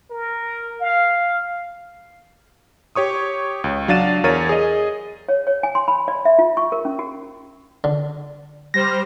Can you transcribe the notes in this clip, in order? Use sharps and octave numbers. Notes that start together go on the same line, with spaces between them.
A#4
F5
G4 C#5 C#6 D#6
C#2
F#3 D4 F5 A6 D#7 E7
E2 A#4 C#5 A6 D#7
G#4 D#5
C#5
C#5
G#5
C6
B5
D5
E5
F4
C#6
A#4
C#4
F#4
D3
G3 C5 F6 A#6